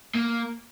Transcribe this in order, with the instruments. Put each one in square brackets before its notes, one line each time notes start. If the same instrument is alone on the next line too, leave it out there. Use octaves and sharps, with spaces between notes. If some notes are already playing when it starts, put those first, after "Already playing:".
[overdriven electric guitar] A#3